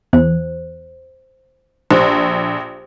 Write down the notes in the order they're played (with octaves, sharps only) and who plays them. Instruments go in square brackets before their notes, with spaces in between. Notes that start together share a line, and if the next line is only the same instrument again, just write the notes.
[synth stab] E2 [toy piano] C5
[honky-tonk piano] A#1 [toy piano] G4 C5